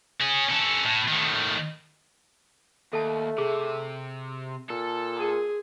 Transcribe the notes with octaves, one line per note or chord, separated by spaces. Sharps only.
C#4 G#4
C#4 A4
A2
A2 D#3
D#2 A3 A4 A5
C3 G#4
A#2 A4
G#4 A#4 C6